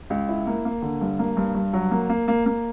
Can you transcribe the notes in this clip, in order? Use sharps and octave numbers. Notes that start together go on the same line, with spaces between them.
C#2
E4
A#3
A#3
D3
G2
A#3
G2
G2
F#3
A#3
A#3
A#3
A#3